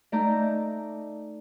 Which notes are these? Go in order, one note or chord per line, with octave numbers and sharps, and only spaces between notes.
A3 D#4 D5 A#5 G6